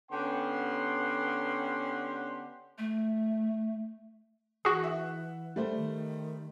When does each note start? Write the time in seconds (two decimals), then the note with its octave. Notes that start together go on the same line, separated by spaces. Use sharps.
0.11 D3 B3 C#4 G4 F#5 C6
2.78 A3
4.65 E3 F#4 G#4 F#6
4.83 E5 F#5
5.56 G3 A3 C5
5.75 D#3